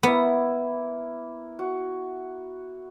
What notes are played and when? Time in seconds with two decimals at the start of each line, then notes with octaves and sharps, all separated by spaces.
0.03 A#3 B3 E4
1.59 F#4